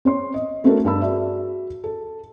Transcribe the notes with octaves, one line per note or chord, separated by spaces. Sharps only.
C4 C#5 C6
D#5
A3 C4 D4 F#4 A4 A#4
G2 A#4 A5 B5 E6
F#4 G#4 D5 E5
A4